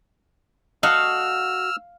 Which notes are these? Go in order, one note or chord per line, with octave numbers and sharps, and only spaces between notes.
G3 F#4 A4 D#5 F5 E6 F6